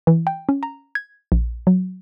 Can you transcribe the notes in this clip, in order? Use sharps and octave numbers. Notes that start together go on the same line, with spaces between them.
E3
G5
C#4
A#5
G#6
A#1
F#3